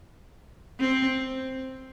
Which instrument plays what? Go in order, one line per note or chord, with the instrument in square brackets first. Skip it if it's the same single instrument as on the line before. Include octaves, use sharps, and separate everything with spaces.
[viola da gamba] C4